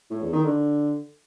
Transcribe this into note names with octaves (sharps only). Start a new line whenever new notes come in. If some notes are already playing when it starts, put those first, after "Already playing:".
A2
E2
D#3
D3